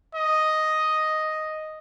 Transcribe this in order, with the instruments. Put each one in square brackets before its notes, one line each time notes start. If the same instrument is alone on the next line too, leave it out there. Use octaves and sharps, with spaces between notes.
[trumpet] D#5